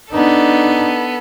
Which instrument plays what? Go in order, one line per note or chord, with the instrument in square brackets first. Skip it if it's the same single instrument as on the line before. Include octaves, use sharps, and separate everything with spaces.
[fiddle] B3 A4 [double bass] D4 D#4